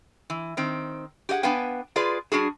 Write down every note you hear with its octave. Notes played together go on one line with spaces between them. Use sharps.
E3
D#3 C4
G4 G#4 D#5 F#5
B3 D4 B4 F5 G5 G#5
F4 G#4 B4 D5
G3 D4 F#4 G#4